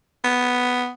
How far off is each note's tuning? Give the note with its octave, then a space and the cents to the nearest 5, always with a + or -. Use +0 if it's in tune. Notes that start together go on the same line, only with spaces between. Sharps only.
B3 +5